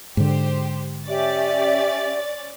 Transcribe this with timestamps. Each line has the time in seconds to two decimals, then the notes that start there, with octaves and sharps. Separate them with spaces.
0.17 G#2 D3 G4 C5
1.08 C#4 G4 D5 E5 A6